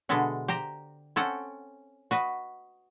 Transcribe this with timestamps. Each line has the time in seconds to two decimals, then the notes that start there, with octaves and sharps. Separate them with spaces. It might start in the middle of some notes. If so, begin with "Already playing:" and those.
0.09 B2 D3 G#3 A4 E5 F#5
0.48 G4 C5 A#5
1.16 C4 C#4 A4 F#5
2.11 F#4 B4 D#5